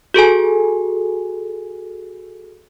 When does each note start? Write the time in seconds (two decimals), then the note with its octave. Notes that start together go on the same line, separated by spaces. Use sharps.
0.14 F#4 G#4 A4 G#5